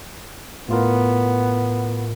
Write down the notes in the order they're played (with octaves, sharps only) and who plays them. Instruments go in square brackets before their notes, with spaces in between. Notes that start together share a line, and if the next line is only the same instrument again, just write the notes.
[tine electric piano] A2 F4 A#4 [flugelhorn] B3